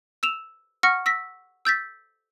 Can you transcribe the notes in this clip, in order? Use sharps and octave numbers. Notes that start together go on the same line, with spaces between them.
E6 E7 F7
F#5 C#6 F6 A#6 C#7
E6 A#6 B6
E6 G6 A6 B6